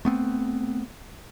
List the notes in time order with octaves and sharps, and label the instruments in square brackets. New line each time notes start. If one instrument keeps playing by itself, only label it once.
[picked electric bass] A3 B3 C4